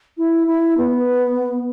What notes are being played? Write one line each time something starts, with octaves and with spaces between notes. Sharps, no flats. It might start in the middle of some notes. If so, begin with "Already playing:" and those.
E4
E4
B3